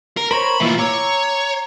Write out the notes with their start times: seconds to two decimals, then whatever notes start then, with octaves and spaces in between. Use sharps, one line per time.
0.17 A#4
0.31 A#4 C5 C#5 B5
0.60 A2 E3 A#3 E4 F4
0.79 C#5 A#5 D6 E6